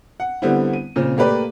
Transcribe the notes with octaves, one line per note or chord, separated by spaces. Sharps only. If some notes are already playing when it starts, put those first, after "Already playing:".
F#5
D3 G3 B3 C4 E4
D#7
A#2 C#3 C4
A3 A#3 G4 B4 D5